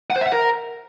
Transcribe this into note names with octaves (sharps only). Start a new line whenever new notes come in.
F#5
C5
E5
F#5
A#4